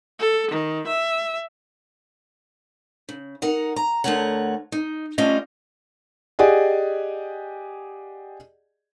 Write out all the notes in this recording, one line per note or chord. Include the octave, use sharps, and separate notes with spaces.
A4
D#3
E5
C#3
D#4 A#4 F#5
A#5
D2 E3 A3 A#4 C#5 F#5
D#4
G3 A3 C#4 F4 D#5 F5
G4 G#4 D5 D#5 F#5 G#5